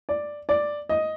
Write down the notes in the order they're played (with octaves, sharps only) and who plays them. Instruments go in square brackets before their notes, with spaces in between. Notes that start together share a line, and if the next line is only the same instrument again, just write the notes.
[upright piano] D5
D5
D#5